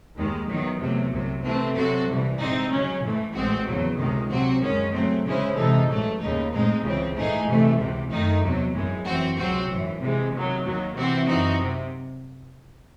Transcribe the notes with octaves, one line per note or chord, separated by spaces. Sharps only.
D#2 D#3 G#3
E2 D#3 F#3
E2 C3 F#3 A3
C2 C3 F#3
C3 E3 A3 C4
C3 F#3 C4 F#4 A4
C2 C3 E3
G#2 E3 C4 D#4
C#3 F#3 C#4
G#2 E3 A3
A1 A2 G#3 C4 F#4
E2 C#3 F#3
C#2 C3 D#3 G#3
C3 F#3 C4 F#4
F#2 D#3 G#3 C#4
C#3 F#3 A3 C4
C#3 G#3 C#4 E4 C5
C3 E3 G#3 D#4 A4
A1 G#2 F#3 A3
D#2 C#3 G#3 D#4
A2 G#3 C4 D#4
C#2 C#3 E3 C4
G#2 E3 A3 D#4 G#4
C3 E3 A3
C#2 C3 E3
F#2 D#3 A3 D#4
E2 C3 F#3
G#1 F#2 E3 G#3
F#2 E3 C4 F#4
C#2 C3 F#3 C4 F#4
G#1 F#2 E3
C3 E3 G#3
C3 D#3 F#3
D#2 D#3 F#3
C3 E3 C4 F#4
F#2 E3 C4 D#4 F#4
C3